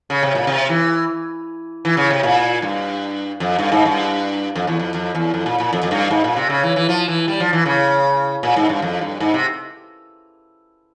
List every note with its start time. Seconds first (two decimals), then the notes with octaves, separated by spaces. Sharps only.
0.10 C#3
0.23 C3
0.35 A#2
0.47 C3
0.69 E3
1.85 E3
1.97 C#3
2.10 C3
2.23 A#2
2.62 G2
3.40 F2
3.58 G2
3.72 G#2
3.85 G2
4.55 F2
4.67 E2
4.79 F2
4.94 F2
5.15 E2
5.34 F2
5.46 A#2
5.60 A#2
5.73 F2
5.83 F2
5.91 G2
6.11 G#2
6.24 A#2
6.36 C3
6.50 C#3
6.63 E3
6.76 E3
6.89 F3
7.08 E3
7.28 G3
7.40 F3
7.53 E3
7.66 C#3
8.43 A#2
8.56 G#2
8.69 G2
8.82 F2
9.01 G2
9.20 G#2
9.34 C3